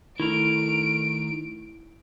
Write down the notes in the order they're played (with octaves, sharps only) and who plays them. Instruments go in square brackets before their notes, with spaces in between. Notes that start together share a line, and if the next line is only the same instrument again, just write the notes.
[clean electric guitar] D#3 A3 A#4 [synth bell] E4 [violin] D7